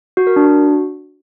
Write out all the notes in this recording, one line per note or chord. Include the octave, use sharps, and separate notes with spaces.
F#4
A#4
D4
F#4